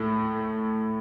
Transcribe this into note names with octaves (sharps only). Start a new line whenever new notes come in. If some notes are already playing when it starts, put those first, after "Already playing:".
Already playing: A2 A3